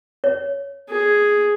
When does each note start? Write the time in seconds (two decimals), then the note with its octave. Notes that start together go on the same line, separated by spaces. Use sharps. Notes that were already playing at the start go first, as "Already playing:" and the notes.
0.24 C#5
0.90 G#4